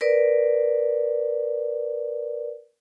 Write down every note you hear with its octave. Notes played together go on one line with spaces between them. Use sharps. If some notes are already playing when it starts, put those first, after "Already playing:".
A#4 B4 D5